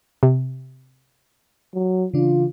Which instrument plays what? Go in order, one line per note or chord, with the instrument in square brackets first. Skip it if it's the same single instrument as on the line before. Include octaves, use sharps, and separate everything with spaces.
[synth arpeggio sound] C3
[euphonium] F#3
[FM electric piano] C#3 E3 D4 [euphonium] F4